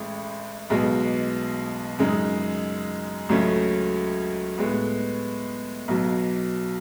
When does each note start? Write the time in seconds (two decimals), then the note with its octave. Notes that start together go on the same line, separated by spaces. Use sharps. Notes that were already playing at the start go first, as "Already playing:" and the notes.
Already playing: A1 A2 G#3
0.70 B1 B2 G#3
1.99 F#2 C#3 G#3 D#4
3.29 C#2 C#3 F#3 A3 C#4
4.58 A2 G#3 B3
5.88 B1 B2 F#3